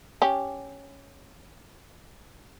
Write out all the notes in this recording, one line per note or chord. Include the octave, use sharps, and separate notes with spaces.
C#4 G4